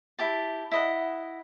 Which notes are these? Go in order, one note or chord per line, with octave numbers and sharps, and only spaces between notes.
E4 G4 A5
E4 D#5 F#5